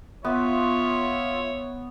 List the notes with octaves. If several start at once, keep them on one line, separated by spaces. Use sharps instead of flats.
B3 F4 C#5 E5